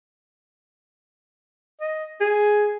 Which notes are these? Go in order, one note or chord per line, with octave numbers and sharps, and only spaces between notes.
D#5
G#4